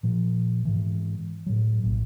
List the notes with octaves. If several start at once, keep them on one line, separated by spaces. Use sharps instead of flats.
A#2 F3
G#2 E3
A2 F#3
A#1 A2